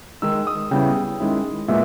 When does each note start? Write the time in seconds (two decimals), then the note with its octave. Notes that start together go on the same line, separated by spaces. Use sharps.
0.22 D#3 G#3 D#4 E6
0.47 D#6
0.71 C#3 G3 B3 E4 G5
1.20 D#3 G#3 C#4 E4
1.68 A#2 G#3 B3 E5